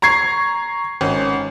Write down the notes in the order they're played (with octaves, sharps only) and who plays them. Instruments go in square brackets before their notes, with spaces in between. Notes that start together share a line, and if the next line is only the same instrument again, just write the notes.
[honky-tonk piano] A#5 C#6 G#6 C7
G#1 C#4